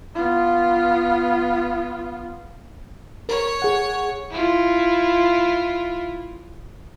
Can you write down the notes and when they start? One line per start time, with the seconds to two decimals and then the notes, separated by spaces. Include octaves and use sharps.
0.15 B3 F4
3.29 A#4 C#5
3.62 G#4 F#5
4.31 E4 F4